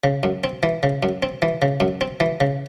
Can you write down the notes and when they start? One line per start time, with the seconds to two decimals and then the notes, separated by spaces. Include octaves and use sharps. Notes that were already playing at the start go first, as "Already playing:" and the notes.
0.04 C#3
0.23 F#2
0.44 C4
0.63 E3
0.83 C#3
1.03 F#2
1.23 C4
1.42 E3
1.62 C#3
1.80 F#2
2.01 C4
2.20 E3
2.40 C#3